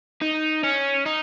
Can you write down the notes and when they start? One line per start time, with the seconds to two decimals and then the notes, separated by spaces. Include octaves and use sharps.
0.22 D#4
0.64 C#4
1.06 D#4